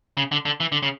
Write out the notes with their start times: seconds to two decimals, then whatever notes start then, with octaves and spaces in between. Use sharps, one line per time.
0.17 C#3
0.32 D3
0.45 D3
0.60 E3
0.72 D3
0.83 C#3